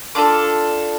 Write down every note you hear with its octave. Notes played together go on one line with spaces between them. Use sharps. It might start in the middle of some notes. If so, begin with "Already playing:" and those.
D4 F4 A4 D6